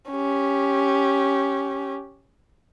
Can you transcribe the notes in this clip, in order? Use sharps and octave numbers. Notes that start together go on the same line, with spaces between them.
C#4 G4